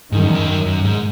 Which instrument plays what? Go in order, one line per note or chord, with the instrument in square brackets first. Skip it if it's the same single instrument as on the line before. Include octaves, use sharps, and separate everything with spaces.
[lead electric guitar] G#2 [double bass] D#3
[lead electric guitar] F#2
E2
F#2
F#2
G#2